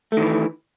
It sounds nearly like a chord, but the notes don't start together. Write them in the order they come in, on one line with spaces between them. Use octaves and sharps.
A3 D#3 E3